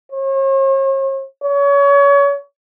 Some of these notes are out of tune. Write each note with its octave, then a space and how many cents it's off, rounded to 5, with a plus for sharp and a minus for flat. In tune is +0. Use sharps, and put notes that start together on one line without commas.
C#5 -45
C#5 +30